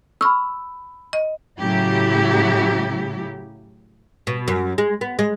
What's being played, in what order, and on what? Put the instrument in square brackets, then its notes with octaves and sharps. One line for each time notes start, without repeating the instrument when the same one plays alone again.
[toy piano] B5 E6 [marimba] C#6 F6
[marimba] D#5
[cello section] A2 C#3 F#3 E4 G4
[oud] B2
F#2
G#3
B3
G#3